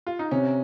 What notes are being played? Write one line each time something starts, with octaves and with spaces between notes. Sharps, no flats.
F4
D#4
C3 C#4